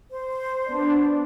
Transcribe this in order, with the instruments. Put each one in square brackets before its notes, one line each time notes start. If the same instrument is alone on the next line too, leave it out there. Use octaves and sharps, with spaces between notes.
[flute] C5
[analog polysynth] B3 D4